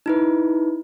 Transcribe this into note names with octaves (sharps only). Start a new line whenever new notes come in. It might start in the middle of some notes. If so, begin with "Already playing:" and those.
D#4 E4 B4